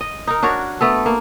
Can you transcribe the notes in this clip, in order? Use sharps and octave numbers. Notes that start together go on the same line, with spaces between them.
D#5
D#4 A#4
D4 F#4 A#4 C#5
A3 B3 A4
A#3